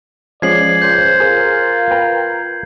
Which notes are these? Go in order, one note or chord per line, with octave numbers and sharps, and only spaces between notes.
F3 G#3 C#4 D5 G#6 C7 F#7
C#2 C5 G6
F4 G#4 A#4 C5
B4 G5 A#5